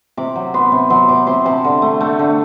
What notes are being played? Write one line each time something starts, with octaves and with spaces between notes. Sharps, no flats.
C3 D6
F#3
B3 C6
C3
F#3 C6
C3 D6
C3 C6
C3 A5
D3
A3
A3
D3